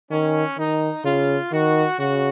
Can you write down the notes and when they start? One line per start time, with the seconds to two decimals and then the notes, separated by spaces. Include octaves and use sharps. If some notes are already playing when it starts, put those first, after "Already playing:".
0.11 D#3 C#4
0.57 D#3 D#4
1.04 C#3 F4
1.52 D#3 F#4
1.99 C#3 F#4